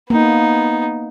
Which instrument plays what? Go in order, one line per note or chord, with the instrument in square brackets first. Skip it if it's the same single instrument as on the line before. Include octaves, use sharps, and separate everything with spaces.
[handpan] A#3 [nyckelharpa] B3 D#4